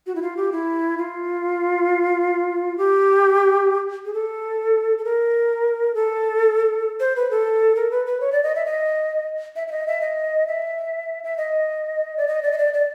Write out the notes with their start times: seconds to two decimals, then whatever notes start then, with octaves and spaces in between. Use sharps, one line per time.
0.07 F#4
0.15 E4
0.22 F4
0.37 G4
0.52 E4
0.98 F4
2.78 G4
4.05 G#4
4.13 A4
4.98 A4
5.04 A#4
5.95 A4
7.00 C5
7.16 B4
7.31 A4
7.76 A#4
7.91 B4
8.06 B4
8.21 C#5
8.32 D5
8.43 D#5
8.55 E5
8.66 D#5
9.56 E5
9.68 E5
9.71 D#5
9.87 E5
10.01 D#5
10.47 E5
11.24 E5
11.38 D#5
12.17 D5
12.28 D#5
12.43 D5
12.52 D#5
12.58 D5
12.74 D5